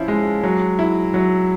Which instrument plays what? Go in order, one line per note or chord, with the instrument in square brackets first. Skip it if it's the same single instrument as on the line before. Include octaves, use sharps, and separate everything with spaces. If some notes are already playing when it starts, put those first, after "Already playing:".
Already playing: [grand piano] F3 C#4 E4
G#3
F#3
E4
F#3